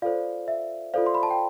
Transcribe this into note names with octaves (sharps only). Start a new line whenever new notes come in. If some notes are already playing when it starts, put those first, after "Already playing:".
F4 A4 C5 D5 F5
E5
F4 A4 C5 D5 F5
C6
B5
A5
G5